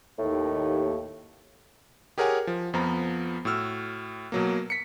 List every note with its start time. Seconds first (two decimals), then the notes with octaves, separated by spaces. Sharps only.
0.19 D#2 A2
2.18 G4 G#4 A#4 C#5 F#5 G#5
2.47 F3
2.74 F2 F3 B3 A#5
3.45 A2 F#4 E6 F6
4.32 B2 F#3 A#3
4.70 B6 C#7